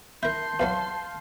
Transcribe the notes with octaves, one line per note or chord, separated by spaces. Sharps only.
E4 A#4 A5 C6 G6
E2 E3 F#3 F5